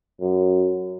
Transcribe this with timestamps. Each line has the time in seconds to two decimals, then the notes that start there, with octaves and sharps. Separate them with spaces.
0.20 F#2